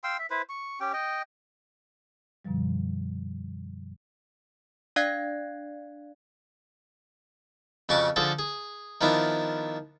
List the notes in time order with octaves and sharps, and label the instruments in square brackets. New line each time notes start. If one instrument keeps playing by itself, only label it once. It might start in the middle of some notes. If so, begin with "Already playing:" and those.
[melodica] F5 G5 C6 E6
E5
E4 B4 C5
C#6
C#4 G4 G5
D#5 G5
[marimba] F#2 B2 D3 F3 G3
[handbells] D4 D5 F5 F#6 G#6 C7
[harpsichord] F2 C#3 F#4 A5 C#6 D6
D3 F3 G#4 A4
G#4
D#3 F3 B3 D4 E4